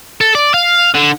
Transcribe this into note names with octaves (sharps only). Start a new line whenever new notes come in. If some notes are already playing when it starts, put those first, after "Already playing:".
A4
D5
F5
D3